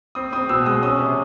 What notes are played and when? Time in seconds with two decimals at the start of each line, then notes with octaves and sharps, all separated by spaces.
0.15 C4 D#6
0.32 C4 D#6
0.49 B2 E6
0.66 G#3 D#6
0.83 C#4 D#6
0.99 C3